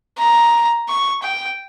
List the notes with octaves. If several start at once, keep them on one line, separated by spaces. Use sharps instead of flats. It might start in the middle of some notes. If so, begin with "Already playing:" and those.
A#5
C#6
G5